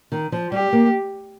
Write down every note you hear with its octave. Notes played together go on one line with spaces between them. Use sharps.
D#3
F3
G3 G4
A#3